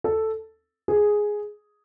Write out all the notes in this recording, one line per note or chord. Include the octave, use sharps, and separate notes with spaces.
A4
G#4